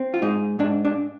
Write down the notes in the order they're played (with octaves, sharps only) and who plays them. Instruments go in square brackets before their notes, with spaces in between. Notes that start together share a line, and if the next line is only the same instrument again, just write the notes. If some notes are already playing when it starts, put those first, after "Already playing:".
Already playing: [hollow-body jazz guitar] C4
F4
G#2 D#4
G#2 D4
D4